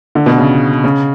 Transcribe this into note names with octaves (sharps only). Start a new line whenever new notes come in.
D3
B2
C#3
C#3